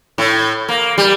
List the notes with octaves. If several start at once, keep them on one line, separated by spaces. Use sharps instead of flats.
A2
A#3
G3